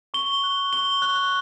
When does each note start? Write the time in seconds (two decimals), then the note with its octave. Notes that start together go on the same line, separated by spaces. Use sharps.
0.14 C#6 G7
0.44 F#6
0.73 C#6 G7
1.02 F#6